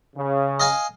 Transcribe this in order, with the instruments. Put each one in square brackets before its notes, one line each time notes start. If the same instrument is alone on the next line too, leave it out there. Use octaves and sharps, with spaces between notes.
[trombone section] C#3
[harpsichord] D#5 F5 G#5